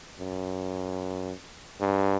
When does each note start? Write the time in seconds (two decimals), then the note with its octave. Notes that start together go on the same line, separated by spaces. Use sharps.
0.19 F#2
1.81 G2